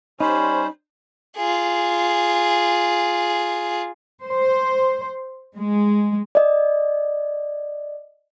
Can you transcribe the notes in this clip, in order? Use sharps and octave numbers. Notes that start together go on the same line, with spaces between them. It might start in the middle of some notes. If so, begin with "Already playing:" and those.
G3 C#4 D#4 C5 B5
F4 G#4
C5
G#3
D5 D#5